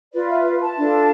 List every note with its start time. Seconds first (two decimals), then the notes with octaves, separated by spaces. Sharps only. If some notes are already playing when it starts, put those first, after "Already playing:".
0.13 F4 B4 D5
0.29 E5
0.62 A5
0.78 D4 F4 A4